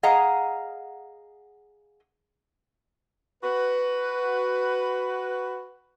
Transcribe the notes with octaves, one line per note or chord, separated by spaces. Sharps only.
G#4 D#5 F5 F#5 A#5
F#4 B4